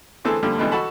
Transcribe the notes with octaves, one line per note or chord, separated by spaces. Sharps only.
D3 E3 A3 C4 G#4 A4
A#2 D3 F3 G3
G#2 B2 D3 E3 G3
F#4 A4 A5 B5